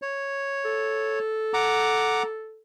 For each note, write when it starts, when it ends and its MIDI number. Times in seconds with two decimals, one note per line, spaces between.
0.02 1.19 73
0.65 2.62 69
1.54 2.23 78
1.54 2.23 82
1.54 2.23 86